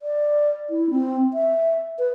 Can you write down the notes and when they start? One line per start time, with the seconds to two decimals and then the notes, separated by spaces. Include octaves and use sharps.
0.01 D5
0.70 E4
0.90 C4
1.34 E5
1.99 B4